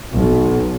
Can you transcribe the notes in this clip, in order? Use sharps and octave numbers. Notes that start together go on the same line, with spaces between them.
B1